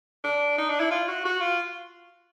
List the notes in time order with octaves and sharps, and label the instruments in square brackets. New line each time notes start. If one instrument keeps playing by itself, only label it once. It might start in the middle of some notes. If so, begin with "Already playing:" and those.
[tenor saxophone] D4
D#4
D4
E4
F4
F#4
F#4
F4